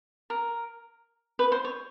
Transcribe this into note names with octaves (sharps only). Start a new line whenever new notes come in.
A#4
B4
C5
C#5